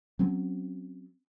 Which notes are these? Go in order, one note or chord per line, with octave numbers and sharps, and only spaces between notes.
F#3 C4 C#4